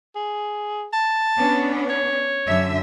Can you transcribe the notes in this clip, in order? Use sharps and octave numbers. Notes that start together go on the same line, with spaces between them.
G#4
A5
B3 C#4 D4
C#5
F#2 D3 E5